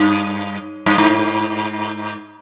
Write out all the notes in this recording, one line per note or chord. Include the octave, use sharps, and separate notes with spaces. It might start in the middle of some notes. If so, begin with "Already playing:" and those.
Already playing: G2
G2
G#2